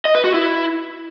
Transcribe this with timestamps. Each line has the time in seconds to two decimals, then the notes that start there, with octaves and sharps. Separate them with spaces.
0.05 D#5
0.15 B4
0.24 F#4
0.34 E4